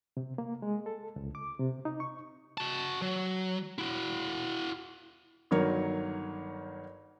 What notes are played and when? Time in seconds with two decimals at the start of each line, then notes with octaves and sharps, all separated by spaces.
0.17 C3
0.38 A#3
0.62 G#3
0.86 A4
1.16 C#2
1.35 D6
1.59 C3
1.85 D#4
2.00 C#6
2.58 F#4 A5
3.02 F#3
3.78 E4 F#4
5.51 G1 D#3 F#3 A#4 C#5